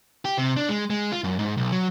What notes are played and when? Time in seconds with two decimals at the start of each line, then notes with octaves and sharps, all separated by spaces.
0.25 G4
0.38 C3
0.57 D4
0.69 G#3
0.90 G#3
1.12 F4
1.24 F#2
1.39 G#2
1.57 B1
1.72 F#3